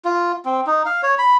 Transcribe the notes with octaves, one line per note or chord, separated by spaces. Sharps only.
F4
C4
D#4
F5
C#5
B5